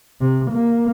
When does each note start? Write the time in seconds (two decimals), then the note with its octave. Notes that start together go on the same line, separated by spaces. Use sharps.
0.21 C3
0.51 A#3